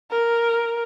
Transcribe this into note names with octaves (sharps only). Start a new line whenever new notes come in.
A#4